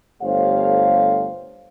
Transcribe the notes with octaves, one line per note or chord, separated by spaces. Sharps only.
G1 A3 G4 C5 C#5 F5